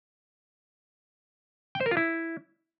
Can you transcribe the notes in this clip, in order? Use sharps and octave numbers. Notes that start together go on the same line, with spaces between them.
G5
C5
A#4
F4
E4